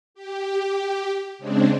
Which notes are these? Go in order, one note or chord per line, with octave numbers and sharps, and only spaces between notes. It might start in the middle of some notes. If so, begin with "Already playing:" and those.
G4
C#3 G#3 C4 D4